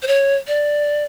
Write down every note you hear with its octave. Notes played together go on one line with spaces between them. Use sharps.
C5
C#5
D5